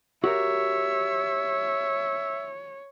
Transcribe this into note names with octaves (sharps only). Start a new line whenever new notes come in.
F#4 G4 A#4 C#5 E5